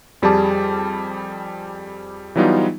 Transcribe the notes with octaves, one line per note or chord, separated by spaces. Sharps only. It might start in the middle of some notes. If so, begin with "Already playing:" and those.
F2 G3 G4 G#4 A5 D6
E3 F#3 G3 B3 D#4 F4